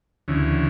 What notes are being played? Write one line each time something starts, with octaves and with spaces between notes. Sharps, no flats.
D2 C#3 E3